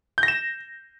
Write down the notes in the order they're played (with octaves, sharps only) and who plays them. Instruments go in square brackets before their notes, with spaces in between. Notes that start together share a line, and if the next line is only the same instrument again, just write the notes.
[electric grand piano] G6
A#6
E7